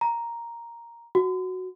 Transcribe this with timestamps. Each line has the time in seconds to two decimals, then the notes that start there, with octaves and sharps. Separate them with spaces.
0.01 A#5
1.15 F#4